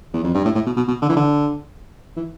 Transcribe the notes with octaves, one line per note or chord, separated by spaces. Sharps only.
E2
F2
G2
A2
A2
B2
B2
B2
D3
E3
D3
E3